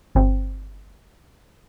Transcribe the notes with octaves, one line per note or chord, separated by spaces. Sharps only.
G1 C4